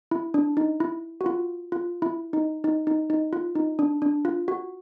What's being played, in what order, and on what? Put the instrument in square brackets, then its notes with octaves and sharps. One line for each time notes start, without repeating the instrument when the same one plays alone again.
[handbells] E4
D4
D#4
E4
F#4
F4
F4
E4
D#4
D#4
D#4
D#4
F4
D#4
D4
D4
F4
F#4